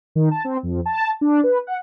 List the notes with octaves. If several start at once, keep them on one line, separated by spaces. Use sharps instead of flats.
D#3
A5
C4
F2
A5
D4
B4
F#5